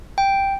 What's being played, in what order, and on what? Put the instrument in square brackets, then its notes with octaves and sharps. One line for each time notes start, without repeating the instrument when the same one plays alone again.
[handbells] G5